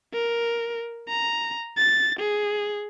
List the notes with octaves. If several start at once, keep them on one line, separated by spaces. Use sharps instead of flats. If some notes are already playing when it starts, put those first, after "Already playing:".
A#4
A#5
A6
G#4